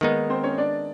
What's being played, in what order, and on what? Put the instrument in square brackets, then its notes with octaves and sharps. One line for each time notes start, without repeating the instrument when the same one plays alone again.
[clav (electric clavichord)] D#3 G#3 B3 D#4 [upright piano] A#3 A#4
[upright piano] C4 C5
C#4 C#5
D4 D5